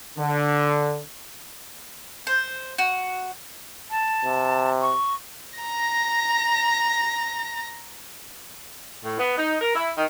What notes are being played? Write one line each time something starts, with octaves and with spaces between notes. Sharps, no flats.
D3
C5
F#4
A5
C3
C#6
A#5 A#6
A2
B3
D#4
A#4
E4
D#3